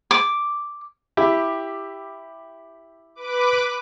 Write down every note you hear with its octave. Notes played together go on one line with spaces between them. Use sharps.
D6
E4 G4
B4 D6